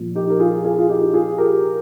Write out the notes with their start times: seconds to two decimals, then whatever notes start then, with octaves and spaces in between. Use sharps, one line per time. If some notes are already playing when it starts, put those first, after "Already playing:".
Already playing: A#2 F3
0.15 D#4 G4
0.30 A#4
0.39 F4 G#4
0.64 F4 G#4
0.79 F4
0.89 D#4 G4
1.14 F4 G#4
1.38 G4 A#4